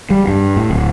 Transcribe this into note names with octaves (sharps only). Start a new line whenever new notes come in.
G3
G2
A2
D1